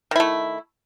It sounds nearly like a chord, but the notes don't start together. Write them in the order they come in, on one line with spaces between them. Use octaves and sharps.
D#3 E4 A3